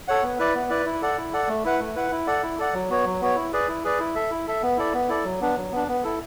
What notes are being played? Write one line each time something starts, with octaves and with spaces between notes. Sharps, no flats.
A4 C#5 F#5
B3
E4 B4 D5
B3
E4 B4 D5
E4
A4 D5 F#5
E4
A4 D5 F#5
A3
E4 B4 F#5
A3
E4 B4 F#5
E4
A4 D5 F#5
E4
A4 D5 F#5
F#3
B3 F#4 C#5
F#3
B3 F#4 C#5
E4
G#4 B4 D5
E4
G#4 B4 D5
E4
A4 E5
E4
A4 E5
B3
E4 A4 D5
B3
E4 A4 D5
F#3
B3 D4
F#3
B3 D4
B3
E4 A4